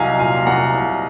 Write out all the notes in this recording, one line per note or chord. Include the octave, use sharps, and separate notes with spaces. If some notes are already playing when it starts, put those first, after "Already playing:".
Already playing: C2 F#3 D#5 F5 F#5 G#5 A#5
A#2 F5 G#5
C2 F#5 A#5
C2